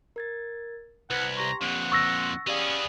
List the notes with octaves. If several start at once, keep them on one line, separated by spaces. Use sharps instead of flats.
A#4 G#6 A6
C2 B4 F#5 G#6 B6
G4 A#5 C6 C#6
F2 A#2 F#5
C#6 E6 A6 A#6
B3 C#4 G4 G#4 D5 F5